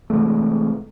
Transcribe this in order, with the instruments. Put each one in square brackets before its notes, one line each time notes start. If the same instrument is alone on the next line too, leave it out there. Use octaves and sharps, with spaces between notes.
[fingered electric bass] C3 E3 G#3 A3